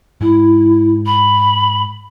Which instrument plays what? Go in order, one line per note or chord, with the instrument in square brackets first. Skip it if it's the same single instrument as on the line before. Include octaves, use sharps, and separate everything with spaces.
[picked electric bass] G#2 G#3 [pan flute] E4
[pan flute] B5